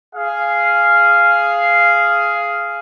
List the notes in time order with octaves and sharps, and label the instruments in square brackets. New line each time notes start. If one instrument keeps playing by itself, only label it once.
[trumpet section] G#4 F5